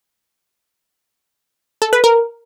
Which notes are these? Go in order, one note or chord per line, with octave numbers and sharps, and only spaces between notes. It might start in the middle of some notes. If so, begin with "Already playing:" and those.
A4
B4
A#4